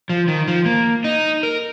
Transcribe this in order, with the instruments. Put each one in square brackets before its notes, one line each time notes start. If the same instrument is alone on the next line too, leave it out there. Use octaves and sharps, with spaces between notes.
[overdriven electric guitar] F3
D#3
F3
A#3
D#4
A#4